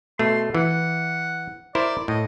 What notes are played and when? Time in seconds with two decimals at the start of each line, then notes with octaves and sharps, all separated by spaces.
0.19 B2 A3 C6
0.55 E3 F#5
1.75 E4 A#4 C5 D5
2.08 A2 D#5